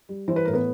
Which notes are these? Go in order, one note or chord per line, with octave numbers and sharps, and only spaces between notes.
G3
E3 C5
B4
A2 A#4
B3 B4